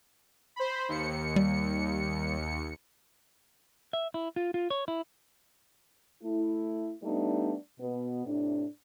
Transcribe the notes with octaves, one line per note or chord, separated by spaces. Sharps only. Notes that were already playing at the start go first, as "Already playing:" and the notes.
C5 B5
D#2 C#7
G3
E5
E4
F4
F4
C#5
E4
A3 E4
G3 A3 B3 D4 D#4
B2 B3
A2 C3 D4